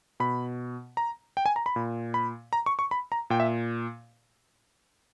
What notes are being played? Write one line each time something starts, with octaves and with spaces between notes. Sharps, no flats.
B2 B5
A#5
G5
G#5
A#5
B5
A#2
B5
A#5
C#6
C#6
B5
A#5
A#2 G5
E5